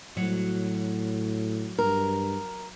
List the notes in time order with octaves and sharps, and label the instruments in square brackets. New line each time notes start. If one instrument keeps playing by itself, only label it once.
[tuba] A2 [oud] F#3
[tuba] G2 [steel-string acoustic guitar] A#4